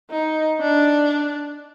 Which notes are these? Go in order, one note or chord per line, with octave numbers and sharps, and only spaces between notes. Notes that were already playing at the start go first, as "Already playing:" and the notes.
D#4
D4